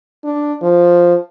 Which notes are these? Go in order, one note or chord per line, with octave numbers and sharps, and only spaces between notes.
D4
F3